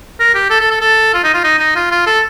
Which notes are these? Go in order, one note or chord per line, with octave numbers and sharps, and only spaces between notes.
A#4
G4
A4
A4
A4
A4
F4
D#4
F4
D#4
D#4
F4
F4
A4